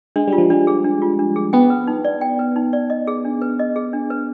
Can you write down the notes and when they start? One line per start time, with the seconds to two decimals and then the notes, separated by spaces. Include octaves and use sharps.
0.16 G#3 D4
0.27 G3
0.33 F4
0.38 F3
0.50 G3 D4
0.67 G#4
0.84 D4
1.02 F4
1.19 D4
1.36 G#4
1.53 B3 G5
1.70 B4
1.87 D#4
2.05 D5
2.21 G5
2.39 B4
2.56 D#4
2.73 D5
2.90 D#5
3.07 G#4
3.25 D4
3.42 B4
3.59 D#5
3.76 G#4
3.93 D4
4.10 B4